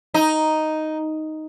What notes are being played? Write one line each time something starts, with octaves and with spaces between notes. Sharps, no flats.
D#4